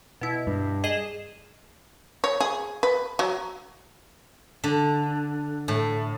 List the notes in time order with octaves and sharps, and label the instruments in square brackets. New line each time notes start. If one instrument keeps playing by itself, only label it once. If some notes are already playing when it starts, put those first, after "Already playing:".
[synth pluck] B2 E4
[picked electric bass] G2
[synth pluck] G#4 D#5 E7
[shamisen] C#5
G#4
B4
F#3
[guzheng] D3
A2